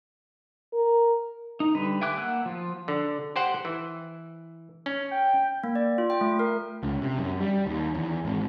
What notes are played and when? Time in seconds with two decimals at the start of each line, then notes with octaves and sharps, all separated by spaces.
0.73 A#4
1.60 D#4
1.75 D3 G3 B4
2.01 E5 G5 G#5 D6 F#6
2.17 A#3 F#5 E6 F#6
2.46 F3 F4
2.88 D3
3.36 G4 C5 F#5
3.65 E3
4.86 C#4
5.11 G5
5.64 A#3
5.75 D5
5.98 F4
6.10 G5
6.21 A3
6.39 A#4
6.83 C#2
7.02 C3
7.18 F#2
7.40 G3
7.66 D#2
7.95 E2
8.25 G#1